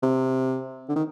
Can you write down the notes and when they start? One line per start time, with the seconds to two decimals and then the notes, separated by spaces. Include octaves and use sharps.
0.02 C3
0.89 D3
0.96 D#3